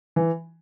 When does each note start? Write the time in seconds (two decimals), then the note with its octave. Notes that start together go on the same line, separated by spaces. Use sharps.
0.16 E3